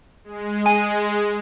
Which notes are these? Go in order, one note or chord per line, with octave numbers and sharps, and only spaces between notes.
G#3
G#5